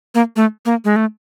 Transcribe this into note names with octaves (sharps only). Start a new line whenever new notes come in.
A#3
A3
A#3
G#3
A3